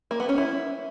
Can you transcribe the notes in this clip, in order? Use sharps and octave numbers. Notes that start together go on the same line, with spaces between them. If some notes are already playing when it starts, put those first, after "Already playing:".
A#3
B3
C#4
E4